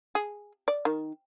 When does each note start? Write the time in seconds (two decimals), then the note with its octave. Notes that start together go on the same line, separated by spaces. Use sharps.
0.15 G#4
0.68 D5
0.85 D#3